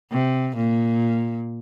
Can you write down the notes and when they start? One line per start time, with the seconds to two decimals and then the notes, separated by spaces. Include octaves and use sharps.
0.11 C3
0.56 A#2